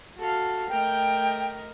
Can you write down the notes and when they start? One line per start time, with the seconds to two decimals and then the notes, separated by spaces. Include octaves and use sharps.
0.19 F#4 A4 F5
0.69 A3 A#4 D#5 G5